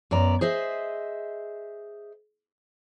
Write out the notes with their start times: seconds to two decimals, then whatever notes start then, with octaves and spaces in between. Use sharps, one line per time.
0.11 F#2 B3 D5 A#5
0.41 G#4 C5 D#5 E5